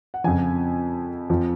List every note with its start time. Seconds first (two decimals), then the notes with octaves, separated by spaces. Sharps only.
0.14 F#5
0.24 F2 C#3 F3 G#5
1.29 F2 F3